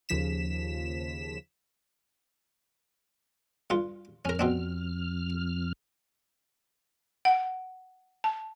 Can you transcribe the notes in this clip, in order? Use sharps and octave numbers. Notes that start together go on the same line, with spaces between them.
D#2 C#3 F3 B6 E7
G2 F4
F2 C#4 A#4 F6
B2 C4 D4
F#5
A5